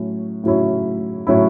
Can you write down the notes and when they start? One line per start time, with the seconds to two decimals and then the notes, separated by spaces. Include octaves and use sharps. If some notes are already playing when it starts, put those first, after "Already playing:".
Already playing: A2 F#3 C#4
0.44 A2 F#3 C#4 E4
1.27 A2 F#3 C#4 E4